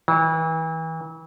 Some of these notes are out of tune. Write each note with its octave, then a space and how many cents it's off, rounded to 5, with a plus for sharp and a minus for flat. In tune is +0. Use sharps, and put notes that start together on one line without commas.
E3 -35